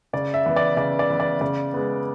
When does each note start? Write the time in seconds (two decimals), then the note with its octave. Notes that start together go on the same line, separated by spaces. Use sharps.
0.13 C#3 D5
0.34 E5
0.46 E3 B3
0.56 D5
0.77 C#3 D5
0.99 D5
1.10 E3 B3
1.20 D5
1.41 C#3 D5
1.74 G#3 B3